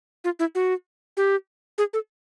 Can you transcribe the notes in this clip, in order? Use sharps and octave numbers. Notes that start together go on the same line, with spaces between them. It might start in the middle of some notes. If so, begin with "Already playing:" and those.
F4
E4
F#4
G4
G#4
A4